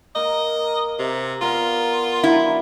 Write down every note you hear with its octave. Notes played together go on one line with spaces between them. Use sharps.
A#3 A#4 D#5
C3
B3 F4 A#4 D5
F#3 E4 D5